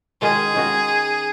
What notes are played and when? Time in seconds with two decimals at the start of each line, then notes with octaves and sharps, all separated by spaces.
0.22 D#3 G#3 C#4 F#4 G#4
0.55 D#3 G#3 C#4 F#4